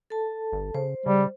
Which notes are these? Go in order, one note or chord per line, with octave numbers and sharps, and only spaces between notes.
A4 A5
G1
C#3 C5
C#3 G3